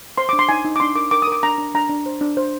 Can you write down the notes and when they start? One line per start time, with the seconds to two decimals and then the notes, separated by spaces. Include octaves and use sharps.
0.18 C5 C6
0.29 D4 D6
0.39 C6
0.49 D#4 G#5
0.65 D#4
0.76 D6
0.80 D4 C6
0.96 A#4 D6
1.11 A#4 D6
1.22 D#6
1.27 A#4 D6
1.43 D4 A#5
1.58 D4
1.74 D4 A#5
1.89 D4
2.06 C5
2.21 D4
2.37 C5